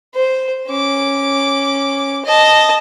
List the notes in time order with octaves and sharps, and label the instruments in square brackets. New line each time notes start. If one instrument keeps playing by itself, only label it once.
[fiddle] C5
C#4 D6
D#5 A5